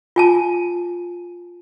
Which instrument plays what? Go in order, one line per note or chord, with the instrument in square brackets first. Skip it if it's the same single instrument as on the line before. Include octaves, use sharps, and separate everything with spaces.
[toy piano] F4 G#5 A5